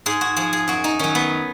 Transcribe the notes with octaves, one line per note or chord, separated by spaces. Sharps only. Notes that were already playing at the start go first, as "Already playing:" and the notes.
G#2 G#4
F#4
F3 G#4
G#4
F#2 F#4
D#4
D#3 F#3 C#4
B3